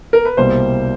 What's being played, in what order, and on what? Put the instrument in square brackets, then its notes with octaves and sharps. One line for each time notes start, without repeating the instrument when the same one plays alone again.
[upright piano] A#4
B4
[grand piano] C2 B2 G3 A#3 [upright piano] C5